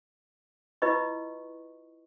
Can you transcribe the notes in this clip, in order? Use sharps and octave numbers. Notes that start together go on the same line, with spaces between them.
E4 F4 B4 D#5 C#6